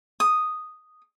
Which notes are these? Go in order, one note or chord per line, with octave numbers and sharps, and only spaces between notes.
D#6